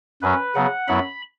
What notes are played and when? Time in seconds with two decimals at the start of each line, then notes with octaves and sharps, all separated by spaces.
0.22 F#2 F#3 C#4 B4
0.55 C#3 F#3 B3 F#5
0.87 F#2 F#3 B3 E4 B5